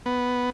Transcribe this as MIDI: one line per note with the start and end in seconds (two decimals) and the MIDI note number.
0.06 0.50 59